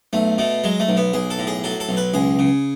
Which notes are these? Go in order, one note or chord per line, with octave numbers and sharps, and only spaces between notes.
B1 A3
B2 A3
F#3 G#3
A3
B1
B3
B1 G#4
A4
A2
G#4
F#3 A4
A4
B1
B4
C#2 G#4
C#3